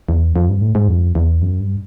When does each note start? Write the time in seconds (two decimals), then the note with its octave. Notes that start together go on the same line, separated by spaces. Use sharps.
0.09 E2
0.36 F2
0.49 G2
0.61 A2
0.75 G#2
0.88 F2
1.15 E2
1.42 F#2
1.60 G2